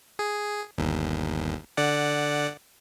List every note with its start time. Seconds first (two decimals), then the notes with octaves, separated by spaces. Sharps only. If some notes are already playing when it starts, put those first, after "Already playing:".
0.19 G#4
0.78 G1 D#2
1.77 D3 D5 F#5